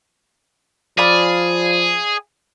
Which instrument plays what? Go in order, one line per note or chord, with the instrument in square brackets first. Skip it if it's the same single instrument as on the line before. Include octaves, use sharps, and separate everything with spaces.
[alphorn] F3 [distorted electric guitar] G#4 [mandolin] D5 F5 B5